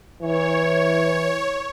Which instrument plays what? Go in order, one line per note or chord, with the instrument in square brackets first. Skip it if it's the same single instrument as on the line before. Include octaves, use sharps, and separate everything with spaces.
[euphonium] E3 [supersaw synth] C#5